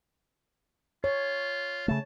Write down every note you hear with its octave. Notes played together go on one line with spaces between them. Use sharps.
F4 C#5
C#3 A3 A5